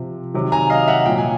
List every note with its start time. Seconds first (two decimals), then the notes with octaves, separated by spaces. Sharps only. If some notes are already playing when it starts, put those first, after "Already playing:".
Already playing: C3 F3
0.34 C3 D#3 F#3
0.52 G#5 A#5
0.70 D#5 F5
0.88 E5 F#5
1.05 A#2 F#3 G5
1.18 G#5